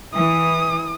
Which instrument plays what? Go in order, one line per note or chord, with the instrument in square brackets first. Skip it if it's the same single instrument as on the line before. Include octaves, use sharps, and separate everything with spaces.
[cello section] E3 [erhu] D#6